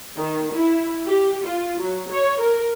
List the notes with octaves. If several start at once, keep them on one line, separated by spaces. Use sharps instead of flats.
D#3
E4
G4
F4
F#3
C#5
A#4